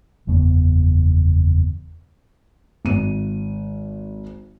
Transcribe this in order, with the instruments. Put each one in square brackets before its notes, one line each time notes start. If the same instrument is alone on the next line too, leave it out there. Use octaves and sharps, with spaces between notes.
[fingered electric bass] F#1 E2 C#3 B3
[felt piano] G#1 D#7